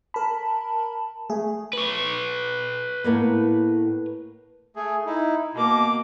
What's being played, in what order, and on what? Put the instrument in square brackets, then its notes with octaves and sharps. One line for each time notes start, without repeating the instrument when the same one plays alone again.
[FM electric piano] A#4 B5 [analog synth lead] A5
[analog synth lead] A3 [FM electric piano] G#4
[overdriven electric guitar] B4 C#5
[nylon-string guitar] A2 A#3 B3
[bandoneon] A3 G#4
D#4 E4
[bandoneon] B2 [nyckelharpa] A#3 D6